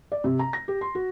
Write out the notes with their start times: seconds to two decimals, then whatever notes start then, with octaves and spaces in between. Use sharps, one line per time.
0.12 D5
0.24 C3
0.39 A#5
0.53 A#6
0.68 G4
0.81 C6
0.95 F#4